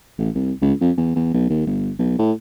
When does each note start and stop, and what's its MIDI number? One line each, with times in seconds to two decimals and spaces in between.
0.18 0.30 33
0.35 0.52 36
0.62 0.73 37
0.81 0.91 41
0.97 1.13 40
1.16 1.31 40
1.34 1.45 35
1.50 1.65 39
1.66 1.91 31
1.99 2.15 35
2.19 2.32 45